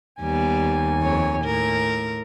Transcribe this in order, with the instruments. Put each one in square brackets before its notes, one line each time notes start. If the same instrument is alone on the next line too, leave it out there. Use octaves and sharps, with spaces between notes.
[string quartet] D#2 G#5 [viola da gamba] G3 B3
[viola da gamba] F2 C#5
A2 A#4